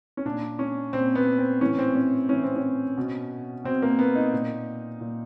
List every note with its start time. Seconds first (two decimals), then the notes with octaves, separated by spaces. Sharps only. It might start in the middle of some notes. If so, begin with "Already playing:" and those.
0.17 C#4
0.26 A#2 D4
0.59 C#4
0.93 A#2 C4
1.15 B3
1.38 C4
1.61 A2 E3 C#4
1.79 C4
1.95 C#4
2.28 A2 E3 C#4
2.43 C4
2.56 C#4
2.97 B2
3.64 B2 C4
3.82 A#3
3.99 B3
4.15 D#4
4.33 A#2
5.00 A#2